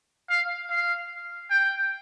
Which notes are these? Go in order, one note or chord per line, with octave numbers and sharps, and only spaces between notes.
F5
F5
G5